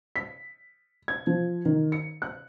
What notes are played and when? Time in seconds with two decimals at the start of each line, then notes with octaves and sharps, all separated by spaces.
0.16 B6
1.08 G#6
1.27 F3
1.65 D#3
1.92 C#7
2.22 F#6